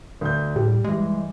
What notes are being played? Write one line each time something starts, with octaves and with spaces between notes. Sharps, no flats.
D2 G6
A2 G3
G2 E3 G#3